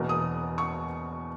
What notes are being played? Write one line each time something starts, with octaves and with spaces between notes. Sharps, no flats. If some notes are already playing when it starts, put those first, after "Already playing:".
Already playing: E1 E2 B2 A#3
D#6
C#6